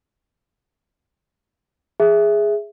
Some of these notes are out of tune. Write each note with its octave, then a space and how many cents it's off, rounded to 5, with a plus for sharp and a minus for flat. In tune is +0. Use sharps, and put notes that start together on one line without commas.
G#4 +0 E5 +0